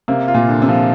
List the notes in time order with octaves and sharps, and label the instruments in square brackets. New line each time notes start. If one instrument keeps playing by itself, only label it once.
[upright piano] C3 [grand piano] A#3
[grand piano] F4
[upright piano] A#2
[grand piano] D3
[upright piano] C3
[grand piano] F3